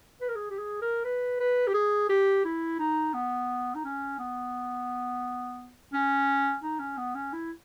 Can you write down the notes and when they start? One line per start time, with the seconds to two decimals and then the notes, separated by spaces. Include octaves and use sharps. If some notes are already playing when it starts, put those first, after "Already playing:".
0.21 B4
0.28 A#4
0.35 G#4
0.51 G4
0.58 G#4
0.82 A#4
1.05 B4
1.40 B4
1.67 G4
1.74 G#4
2.09 G4
2.45 E4
2.79 D#4
3.14 B3
3.75 D#4
3.84 C#4
4.19 B3
5.93 C#4
6.63 D#4
6.79 C#4
6.97 B3
7.15 C#4
7.33 E4